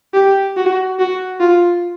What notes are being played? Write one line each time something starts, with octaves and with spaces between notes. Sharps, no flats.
G4
F#4
F#4
F4